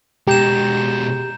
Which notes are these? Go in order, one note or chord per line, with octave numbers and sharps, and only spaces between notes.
B2 G#3 G4 A#5 G6 E7